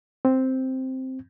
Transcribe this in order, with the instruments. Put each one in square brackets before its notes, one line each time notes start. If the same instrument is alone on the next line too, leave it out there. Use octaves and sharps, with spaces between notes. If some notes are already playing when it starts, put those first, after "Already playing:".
[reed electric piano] C4